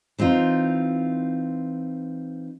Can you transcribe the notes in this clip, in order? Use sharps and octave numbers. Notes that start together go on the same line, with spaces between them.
E3 C4 D#4 F4